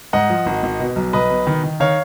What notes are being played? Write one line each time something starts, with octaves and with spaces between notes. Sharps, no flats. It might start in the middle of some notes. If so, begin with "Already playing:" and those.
G#2 D#5 F#5
F3
G#1
G#1
B2
B1
B1 B4 D#5
B2
D#3
D#3
D#3 C#5 F5